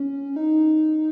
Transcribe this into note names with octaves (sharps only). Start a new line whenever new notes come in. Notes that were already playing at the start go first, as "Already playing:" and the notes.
Already playing: C#4
D#4